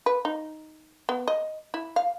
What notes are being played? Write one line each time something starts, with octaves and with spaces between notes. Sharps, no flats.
B4
D#4
B3
D#5
E4
F5